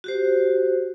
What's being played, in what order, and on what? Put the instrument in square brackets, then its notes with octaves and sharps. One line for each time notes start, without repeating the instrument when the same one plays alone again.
[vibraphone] F#4 G4 C5